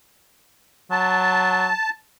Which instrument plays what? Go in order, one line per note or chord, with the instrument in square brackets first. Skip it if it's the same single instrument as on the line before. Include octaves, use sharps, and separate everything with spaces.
[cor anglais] F#3 [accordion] A5